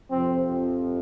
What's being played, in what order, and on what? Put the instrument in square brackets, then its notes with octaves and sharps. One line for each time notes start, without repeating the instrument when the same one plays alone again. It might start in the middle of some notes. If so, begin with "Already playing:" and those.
[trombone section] F2 C3 F3 C4